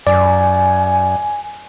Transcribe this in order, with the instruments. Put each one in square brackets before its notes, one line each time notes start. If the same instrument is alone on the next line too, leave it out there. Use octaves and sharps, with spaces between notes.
[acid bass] F#2 [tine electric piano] D5 [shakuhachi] G#5